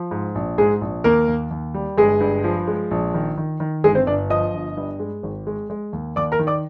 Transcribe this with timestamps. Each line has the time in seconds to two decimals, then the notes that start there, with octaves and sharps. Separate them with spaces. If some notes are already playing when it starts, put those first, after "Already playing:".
Already playing: F3
0.11 G#2
0.35 A#1
0.58 G#2 G#3 G#4
0.81 A#1
1.04 D#2 A#3 A#4
1.28 D#2
1.51 D#2
1.74 G3
1.97 G1 G#3 G#4
2.20 G2
2.44 F3
2.68 G#3
2.91 A#1
3.14 D#3
3.38 D#3
3.60 D#3
3.84 G1 G#3 G#4
3.95 C4 C5
4.07 G1 D4 D5
4.30 F3 D#5 D#6
4.54 G1
4.77 G2
5.00 G#3
5.23 G#1
5.47 G#3
5.70 G#3
5.93 D#2
6.16 D#2 D5 D6
6.32 A#4 A#5
6.39 D#3
6.47 D5 D6